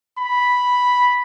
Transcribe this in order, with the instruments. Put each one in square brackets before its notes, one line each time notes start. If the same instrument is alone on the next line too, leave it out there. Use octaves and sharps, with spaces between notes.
[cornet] B5